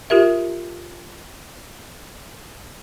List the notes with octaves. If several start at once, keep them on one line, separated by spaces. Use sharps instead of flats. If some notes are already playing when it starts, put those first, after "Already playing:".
F4 G4 A#4 E5